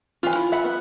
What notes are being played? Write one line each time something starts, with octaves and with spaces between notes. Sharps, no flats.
E3 F4 G#5
E4
E5 F#5 B5
B3